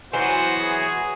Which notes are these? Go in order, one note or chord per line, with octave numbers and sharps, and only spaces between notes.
E3 F#3 B3 F#4 C5
G#4